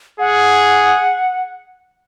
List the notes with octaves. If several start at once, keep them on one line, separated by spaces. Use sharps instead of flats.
G#4 F#5